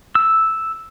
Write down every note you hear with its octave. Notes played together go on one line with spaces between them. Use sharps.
E6